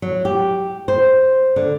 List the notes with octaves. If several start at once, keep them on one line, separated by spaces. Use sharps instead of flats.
F#3
G4
C5
D3